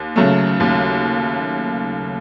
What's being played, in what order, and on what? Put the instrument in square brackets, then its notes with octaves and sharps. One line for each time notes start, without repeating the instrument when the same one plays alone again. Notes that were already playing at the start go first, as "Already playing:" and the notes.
Already playing: [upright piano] D#2
C#3 F#3 A3
D#2